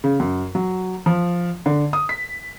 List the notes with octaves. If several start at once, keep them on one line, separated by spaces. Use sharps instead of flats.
C#3
F#2
F#3
F3
D3
D#6
B6